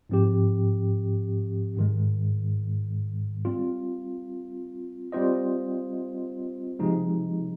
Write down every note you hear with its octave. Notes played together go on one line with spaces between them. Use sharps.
G#2 F3 C4 G4
G#2 D#3 G#3
G3 C4 F4
G3 C4 F4 C5 D#5
C3 F3 G#3 D#4